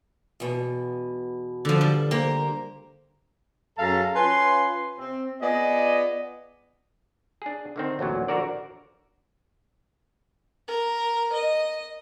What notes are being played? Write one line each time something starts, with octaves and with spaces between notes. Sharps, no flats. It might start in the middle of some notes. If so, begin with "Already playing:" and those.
E2 B2
D3 F3
G3
A#3 G4 A#4 C5
F#2 G#4 A4 F5 A5 A#5
C#4 F4 B4 G#5 C6
C4
B3 F4 G#4 D5 D#5
D4 G#4
D3 D#3 C4
A1 D2 A#2 F#3
D3 F3 F#4 A#4 D5
A#4
D#5